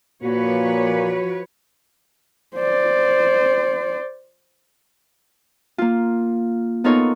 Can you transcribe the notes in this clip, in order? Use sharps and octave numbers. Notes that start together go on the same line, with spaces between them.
A#2 F3 A#3 F#4 B4 C#5
C5 D5
A#3 F4
B3 D#4 F4 A4 A#4 C#5